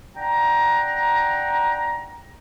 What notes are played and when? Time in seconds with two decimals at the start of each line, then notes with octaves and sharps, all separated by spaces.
0.16 D4 F#5 G5 A#5